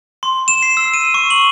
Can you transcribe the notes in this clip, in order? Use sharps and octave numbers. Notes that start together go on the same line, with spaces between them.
C6
E7
C7
E6
D#7
C#6
F#7